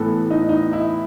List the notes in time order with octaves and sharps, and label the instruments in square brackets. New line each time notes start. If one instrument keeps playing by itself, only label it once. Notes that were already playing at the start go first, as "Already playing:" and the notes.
Already playing: [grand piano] A2 E3 B3 A4
D#4
D#4
E4